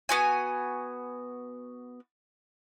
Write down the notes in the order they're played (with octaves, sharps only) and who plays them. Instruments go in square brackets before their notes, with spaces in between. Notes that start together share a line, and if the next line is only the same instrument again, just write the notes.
[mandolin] B3 F#4 G#5